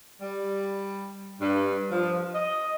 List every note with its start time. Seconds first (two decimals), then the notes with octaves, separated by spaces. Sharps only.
0.21 G3
1.39 G2
1.91 F3
2.33 D#5